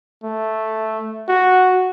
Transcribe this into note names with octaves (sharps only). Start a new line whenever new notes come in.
A3
F#4